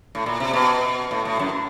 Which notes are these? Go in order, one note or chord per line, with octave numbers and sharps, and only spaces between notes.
A2
A#2
C3
B2
A2
A2
F#2